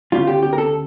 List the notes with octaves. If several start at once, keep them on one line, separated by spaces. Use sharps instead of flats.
D2 C#3 G3 F4
G4
G4
A#4
A4